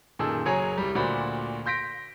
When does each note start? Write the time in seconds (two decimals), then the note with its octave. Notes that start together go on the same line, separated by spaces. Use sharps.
0.19 F#2 A#2 D#3 G#4 A4 E6
0.45 F#1 F#3 G#4 C#5 G#5 A#5
0.78 C2 G3
0.95 D2 A#2 F#4 C5 D5 B5
1.66 C6 G6 A#6 B6 D7